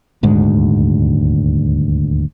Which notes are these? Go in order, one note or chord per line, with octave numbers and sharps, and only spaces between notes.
D#1 D2 G#2 G#3